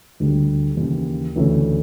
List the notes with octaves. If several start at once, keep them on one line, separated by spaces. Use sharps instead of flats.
D2 D3 G3
D#2 C#3 E3
D2 C#3 E3 A3 C#4